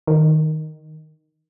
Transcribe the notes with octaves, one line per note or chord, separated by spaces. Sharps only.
D#3